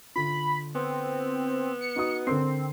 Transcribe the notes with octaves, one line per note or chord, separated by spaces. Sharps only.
D3 F4 B5
B3 C4
C#7
D#4 F#4 D#6
D3 C4 A#4 C7